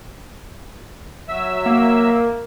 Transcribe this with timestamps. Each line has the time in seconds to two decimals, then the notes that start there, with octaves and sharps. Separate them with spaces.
1.29 F#3 E5 E6
1.66 A#3